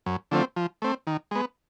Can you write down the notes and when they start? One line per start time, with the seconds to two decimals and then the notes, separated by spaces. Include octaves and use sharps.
0.06 F#2
0.31 D3 F3 A3 C4
0.56 F3
0.82 A3 C4
1.07 D#3
1.31 G#3 B3